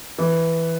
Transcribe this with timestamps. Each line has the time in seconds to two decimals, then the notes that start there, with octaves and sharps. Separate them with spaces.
0.18 E3